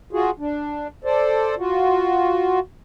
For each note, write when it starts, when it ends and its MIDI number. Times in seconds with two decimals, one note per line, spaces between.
0.13 0.31 65
0.13 0.31 66
0.13 0.31 68
0.39 0.87 62
1.05 1.55 69
1.05 1.55 72
1.05 1.55 74
1.58 2.59 65
1.58 2.59 66